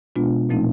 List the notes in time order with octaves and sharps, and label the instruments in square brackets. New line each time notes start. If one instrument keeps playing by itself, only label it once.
[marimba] B2 G#3 B3 D4 F4
A#2 F3 A3 C4 D#4